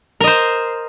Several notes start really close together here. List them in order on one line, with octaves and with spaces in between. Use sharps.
A#4 D#5 C5